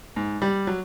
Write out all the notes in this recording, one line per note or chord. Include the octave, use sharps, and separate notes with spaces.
G#2
G3
F#3